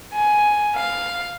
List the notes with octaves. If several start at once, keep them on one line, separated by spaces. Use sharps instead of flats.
G#5
F5